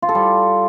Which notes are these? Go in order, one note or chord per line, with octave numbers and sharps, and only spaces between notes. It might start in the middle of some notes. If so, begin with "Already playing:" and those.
F4
A4
G3